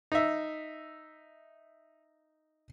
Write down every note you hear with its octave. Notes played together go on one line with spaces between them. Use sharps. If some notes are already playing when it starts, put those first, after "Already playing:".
D#4 E5